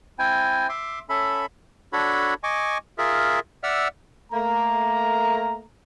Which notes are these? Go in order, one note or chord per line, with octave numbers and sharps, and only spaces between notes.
C4 E4 G5 G#5
E5 C6 D6
C#4 A4 E5 B5
D4 F#4 A4 C#5 B5
D#5 G#5 C#6 D6
F4 G#4 A#4 E5
D5 E5 F#5 E6 F6
A3 A#3 A#5